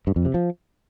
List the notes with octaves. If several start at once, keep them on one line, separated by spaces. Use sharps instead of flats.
G2
F2
C3
F3